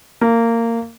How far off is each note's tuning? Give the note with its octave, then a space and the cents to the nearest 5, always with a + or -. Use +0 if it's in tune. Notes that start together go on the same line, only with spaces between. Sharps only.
A#3 -20